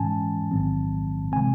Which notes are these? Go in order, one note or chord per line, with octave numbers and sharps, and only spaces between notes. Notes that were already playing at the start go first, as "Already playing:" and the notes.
Already playing: G#2 E3 G#3 C#4 G#5 A5
A1 G#2 D#3 F#3 C4
C3 E3 G#3 C4 G#5